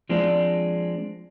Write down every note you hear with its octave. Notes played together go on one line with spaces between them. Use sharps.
F3 G#3 C4 D4